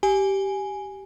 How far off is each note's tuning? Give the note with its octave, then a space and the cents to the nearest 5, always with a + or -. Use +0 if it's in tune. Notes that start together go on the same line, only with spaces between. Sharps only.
G4 -10 G#5 +0